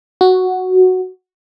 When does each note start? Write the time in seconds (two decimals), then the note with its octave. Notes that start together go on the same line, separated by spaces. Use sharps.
0.21 F#4